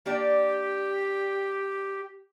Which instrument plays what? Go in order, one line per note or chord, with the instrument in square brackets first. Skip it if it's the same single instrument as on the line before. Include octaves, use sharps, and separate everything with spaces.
[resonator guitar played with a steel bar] A#3 D4 D5 [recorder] G4